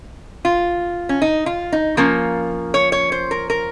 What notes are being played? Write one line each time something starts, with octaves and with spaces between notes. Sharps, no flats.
F4
C#4
D#4
F4
D#4
F3 A#3 C#4 A#4
C#5
C#5
C5
A#4
A#4